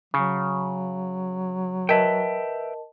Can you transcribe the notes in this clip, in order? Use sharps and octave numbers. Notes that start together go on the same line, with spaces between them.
C#3 F#3
A#4 B4 D#5 E5 G5 A5